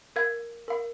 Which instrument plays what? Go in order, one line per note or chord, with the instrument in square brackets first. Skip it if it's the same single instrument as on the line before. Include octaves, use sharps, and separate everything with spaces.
[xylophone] A#4 F5 G#6
A#4 F5